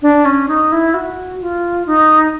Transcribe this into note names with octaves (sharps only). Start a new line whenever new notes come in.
D4
C#4
D#4
E4
F#4
F4
D#4